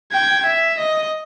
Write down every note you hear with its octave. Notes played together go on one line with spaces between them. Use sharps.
G5 G#6
E5
D#5